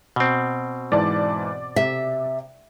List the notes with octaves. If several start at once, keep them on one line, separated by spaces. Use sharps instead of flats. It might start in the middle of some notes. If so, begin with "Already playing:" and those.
B2 C4
G#2 E3 D5 A5
C3 E5